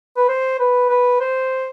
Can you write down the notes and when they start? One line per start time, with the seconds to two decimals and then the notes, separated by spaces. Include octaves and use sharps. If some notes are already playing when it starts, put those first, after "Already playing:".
0.16 B4
0.28 C5
0.59 B4
0.89 B4
1.20 C5